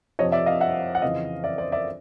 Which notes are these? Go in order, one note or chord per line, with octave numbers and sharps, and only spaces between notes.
F2 C3 F3 C#5 D#5
D5 E5
D#5 F5
E5 F#5
F#5
F2 C#3 E3 D#5 F5
D5 E5
C5 D5
D5 E5